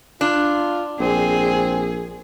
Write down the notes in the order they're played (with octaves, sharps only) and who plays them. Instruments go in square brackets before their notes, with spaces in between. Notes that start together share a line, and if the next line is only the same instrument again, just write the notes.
[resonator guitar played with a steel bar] D4 [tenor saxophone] F4
[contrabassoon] A#1 [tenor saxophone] C4 [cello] G#4